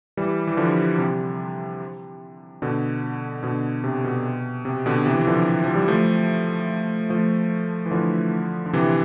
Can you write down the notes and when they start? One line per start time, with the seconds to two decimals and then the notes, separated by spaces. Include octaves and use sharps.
0.17 E3 G3
0.47 E3
0.57 D3 F3
0.98 C3
2.62 B2 D3
3.43 B2 D3
3.84 C3
4.04 B2
4.65 C3
4.86 B2 D3
5.06 C3 E3
5.20 E3
5.27 D3 F3
5.64 F3
5.75 G3
5.88 F3 A3
7.10 F3 A3
7.86 E3
7.91 D3 F3
8.66 D3
8.73 C3 E3